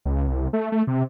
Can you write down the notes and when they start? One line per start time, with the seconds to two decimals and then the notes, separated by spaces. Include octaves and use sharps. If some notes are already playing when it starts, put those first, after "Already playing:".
0.05 C#2
0.27 C2
0.53 A3
0.72 A3
0.87 C3